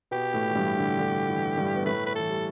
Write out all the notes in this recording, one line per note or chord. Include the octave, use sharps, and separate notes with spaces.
B2 B3 G4
A2 A3
E3
G2 G3
D3
D3
E3
G2 G3
B3
A2 A3 B4
B4
E3 A4
G3